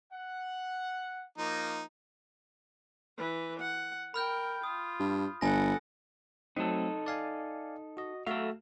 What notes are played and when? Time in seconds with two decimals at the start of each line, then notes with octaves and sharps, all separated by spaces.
0.12 F#5
1.38 F3 A#3 D#4
3.18 E3 B4
3.59 F#5
4.14 A#4 G5 B5 F6 G6
4.64 F4 D#6
4.99 G2
5.41 G1 A4 F#5 G#5 A#6
6.56 F#3 A3 C4 D#4 A4
7.06 D5 F5 G#5
7.97 F#4 D#5
8.27 A3 F#4 A4 E5 F5